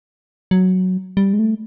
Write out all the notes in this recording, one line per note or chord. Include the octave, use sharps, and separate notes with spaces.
F#3
G3
G#3
A3